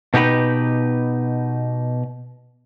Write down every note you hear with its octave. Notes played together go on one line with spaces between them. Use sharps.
B2 D#4 G4 B4